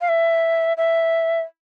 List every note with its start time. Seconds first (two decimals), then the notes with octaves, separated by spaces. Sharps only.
0.01 F5
0.09 E5
0.77 E5